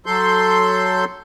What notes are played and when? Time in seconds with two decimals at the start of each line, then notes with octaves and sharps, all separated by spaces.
0.06 F#3 A4 C6 G6